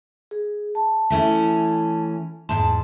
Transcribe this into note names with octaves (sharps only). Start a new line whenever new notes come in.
G#4
A5
E3 A3 C#4
E2 G#2 A5 C6